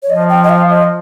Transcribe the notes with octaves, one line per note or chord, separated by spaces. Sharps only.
C#5
F3 D#5
G5
D#5
F5
D#5